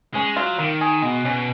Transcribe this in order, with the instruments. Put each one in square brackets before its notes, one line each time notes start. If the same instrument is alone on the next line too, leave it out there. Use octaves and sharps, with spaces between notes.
[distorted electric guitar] G#3 [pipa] C#4
[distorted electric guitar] F#3 [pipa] F4
[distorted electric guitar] D#3 [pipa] A#3
[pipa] G#4
[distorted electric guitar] B2 [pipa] G#3
[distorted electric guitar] B2 [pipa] C#4